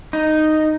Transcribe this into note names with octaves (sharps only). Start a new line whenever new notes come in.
D#4